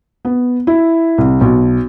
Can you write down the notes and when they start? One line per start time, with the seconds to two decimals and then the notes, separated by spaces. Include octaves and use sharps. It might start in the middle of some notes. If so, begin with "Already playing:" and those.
0.25 B3
0.67 E4
1.18 C2
1.41 B1